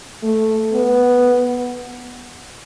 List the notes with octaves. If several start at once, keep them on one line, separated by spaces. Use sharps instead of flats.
A3
B3